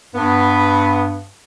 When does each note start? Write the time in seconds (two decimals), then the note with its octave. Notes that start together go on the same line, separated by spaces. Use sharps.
0.15 G2 B3